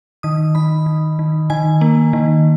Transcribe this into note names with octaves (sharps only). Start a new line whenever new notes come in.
D#3 D#6
D#3 B5
D#3
D#3
D#3 G#5
A#3
D#3